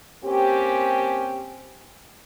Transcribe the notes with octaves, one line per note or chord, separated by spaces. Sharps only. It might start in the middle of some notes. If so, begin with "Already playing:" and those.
A#3 C4 C#4 G4